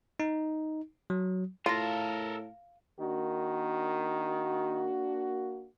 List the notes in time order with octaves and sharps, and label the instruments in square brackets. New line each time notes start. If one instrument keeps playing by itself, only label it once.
[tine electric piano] D#4
F#3
[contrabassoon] A2 [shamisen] F4 [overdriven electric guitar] A4 A#4 [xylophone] F5 A#6
[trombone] D#3 [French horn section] A#3 D4 F#4